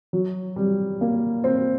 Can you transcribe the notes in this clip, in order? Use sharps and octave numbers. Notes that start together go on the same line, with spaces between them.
F#3
G3
A#3
C4